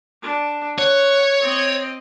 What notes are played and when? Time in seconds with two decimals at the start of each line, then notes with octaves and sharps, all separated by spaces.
0.22 D4
0.78 C#5 F#5
1.41 C4 D#5